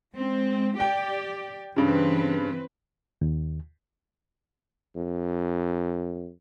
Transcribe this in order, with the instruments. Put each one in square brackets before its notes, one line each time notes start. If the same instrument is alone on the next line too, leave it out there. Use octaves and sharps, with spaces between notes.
[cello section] G#3 C4
[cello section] G4 D5 [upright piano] G5
[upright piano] G2 C#3 [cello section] E3 C4 B4
[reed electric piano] D#2
[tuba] F2